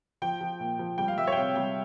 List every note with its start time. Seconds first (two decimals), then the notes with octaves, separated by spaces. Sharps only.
0.22 F3 G5
0.41 F3
0.60 A#2
0.79 F3
0.98 G3 G5
1.08 F5
1.18 G3 E5
1.27 C#5
1.32 G5
1.36 C3 F5
1.56 G3 G5